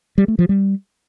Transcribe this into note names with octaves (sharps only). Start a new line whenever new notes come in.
G3
A3
F3
G3